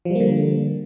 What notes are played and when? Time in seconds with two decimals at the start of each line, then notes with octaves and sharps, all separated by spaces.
0.05 F3
0.10 G3
0.15 A#3
0.20 D3